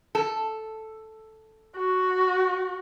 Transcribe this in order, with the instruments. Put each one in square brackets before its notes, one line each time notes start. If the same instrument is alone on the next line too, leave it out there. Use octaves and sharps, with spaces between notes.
[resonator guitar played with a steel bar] A4
[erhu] F#4